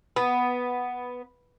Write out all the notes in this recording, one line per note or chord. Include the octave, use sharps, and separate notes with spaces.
B3